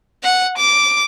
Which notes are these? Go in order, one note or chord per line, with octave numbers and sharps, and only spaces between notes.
F#5
D6